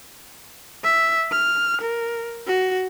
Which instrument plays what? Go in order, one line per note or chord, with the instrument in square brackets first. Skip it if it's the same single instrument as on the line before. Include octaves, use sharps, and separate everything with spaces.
[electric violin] E5
F6
A#4
F#4